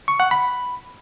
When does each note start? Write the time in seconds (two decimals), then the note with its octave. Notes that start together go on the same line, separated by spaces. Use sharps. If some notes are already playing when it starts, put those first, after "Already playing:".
0.08 C#6
0.20 F#5
0.31 B5